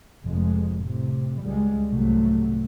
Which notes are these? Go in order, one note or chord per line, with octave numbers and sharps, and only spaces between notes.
F1 F2 G#3
A2 C3
C#2 G3 G#3
C2 G#2 C3 F#3 A3